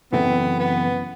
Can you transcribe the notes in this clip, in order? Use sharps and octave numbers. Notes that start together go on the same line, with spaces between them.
F#2 C#3 E3 A3 B3 C4
B3